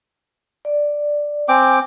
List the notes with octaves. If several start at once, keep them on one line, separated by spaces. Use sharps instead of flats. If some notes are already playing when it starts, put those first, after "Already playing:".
D5
C4 G5 G#5 D6